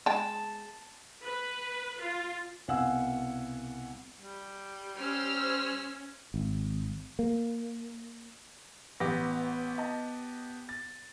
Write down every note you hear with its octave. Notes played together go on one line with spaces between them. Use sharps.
G#3 G5 A5
B4
F4
C2 B2 F5 F#5 G#5 E6
G3
C#4 C5 E6 F6
G#1
A#3
A1 B3 G4 A#6
D#5 A5
A6